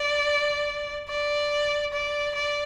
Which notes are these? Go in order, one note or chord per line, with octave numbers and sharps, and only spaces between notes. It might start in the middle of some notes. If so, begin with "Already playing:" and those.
Already playing: D5
D5
D5
D5